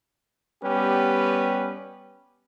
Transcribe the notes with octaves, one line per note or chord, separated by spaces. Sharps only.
G3 B3 C#4 G4 B4